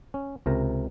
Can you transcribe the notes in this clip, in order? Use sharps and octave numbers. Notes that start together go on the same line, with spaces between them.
C#4
C#2 C3 A#4 A#5